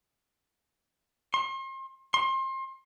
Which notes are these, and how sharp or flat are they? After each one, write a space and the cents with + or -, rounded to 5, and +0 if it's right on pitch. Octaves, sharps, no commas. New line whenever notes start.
C6 +40
C6 +30